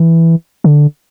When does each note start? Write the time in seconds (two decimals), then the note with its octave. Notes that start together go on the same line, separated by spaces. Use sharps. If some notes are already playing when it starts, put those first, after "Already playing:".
Already playing: E3
0.64 D3